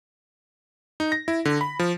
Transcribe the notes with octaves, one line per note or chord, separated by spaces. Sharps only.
D#4
A#6
E4
D3
B5
F3